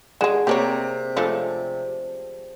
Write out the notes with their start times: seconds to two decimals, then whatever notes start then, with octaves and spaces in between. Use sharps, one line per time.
0.21 D3 G#3 G#4 D7 E7
0.47 C3 A#3 D4 G4 A4 C#5 D5
1.16 C#3 F3 G#3 A3 D4 A4